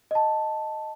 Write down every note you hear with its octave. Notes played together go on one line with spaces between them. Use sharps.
D#5 A5